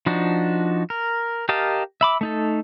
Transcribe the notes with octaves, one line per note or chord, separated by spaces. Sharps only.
F3 D4 D#4 F#4
A#4
G4 A#4 D#5 F5 A5
E5 B5 D6
A3 D#4 A4